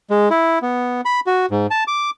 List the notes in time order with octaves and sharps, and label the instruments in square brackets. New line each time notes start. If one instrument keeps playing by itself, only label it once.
[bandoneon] G#3
E4
B3
B5
F#4
G#2
A5
D6